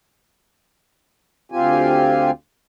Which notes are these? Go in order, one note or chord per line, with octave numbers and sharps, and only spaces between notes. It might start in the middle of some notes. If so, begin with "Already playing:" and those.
D2 C4 F4 G4 G#5